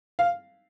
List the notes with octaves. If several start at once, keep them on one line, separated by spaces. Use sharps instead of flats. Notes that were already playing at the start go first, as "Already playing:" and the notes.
F5